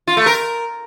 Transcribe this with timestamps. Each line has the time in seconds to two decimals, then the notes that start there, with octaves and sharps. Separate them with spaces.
0.07 F4
0.17 A3
0.26 A#4